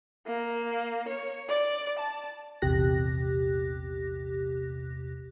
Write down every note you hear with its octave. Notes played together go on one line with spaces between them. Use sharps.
A#3
C#5
D5
A5
A#1 E2 C3 G4 F#6 A#6